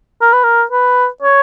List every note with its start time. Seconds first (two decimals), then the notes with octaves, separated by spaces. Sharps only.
0.21 A#4
0.33 B4
0.43 A#4
0.71 B4
1.22 C#5